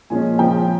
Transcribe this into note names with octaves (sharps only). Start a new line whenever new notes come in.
A#2 F3 G#3 C#4 G#5
C#3 F3 C4 G5